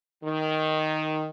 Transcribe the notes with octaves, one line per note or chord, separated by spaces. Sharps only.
D#3